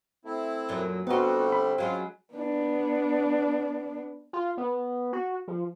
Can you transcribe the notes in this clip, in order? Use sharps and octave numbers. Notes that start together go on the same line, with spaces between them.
A3 C4 E4
F#2 A#2 F#3
D3 G3 A3 B3 C4 D#4 F4 F#4
B5
F#3 G#3 C#4 F4
B3 D4
F4
B3
F#4
F3